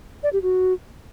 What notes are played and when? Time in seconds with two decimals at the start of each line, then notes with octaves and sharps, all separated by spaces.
0.23 D5
0.33 G4
0.42 F#4